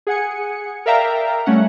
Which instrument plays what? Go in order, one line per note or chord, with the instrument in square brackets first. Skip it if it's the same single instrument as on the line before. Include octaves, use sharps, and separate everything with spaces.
[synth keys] G#4 F#5 G#5 C#7
A#4 D5 E5 F5 G5 A#5
G3 A3 C#4 F#5